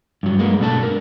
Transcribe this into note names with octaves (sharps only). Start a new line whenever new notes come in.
G2 F#3
G#3 A#3 B3
B2 A3 D4 A5
A#4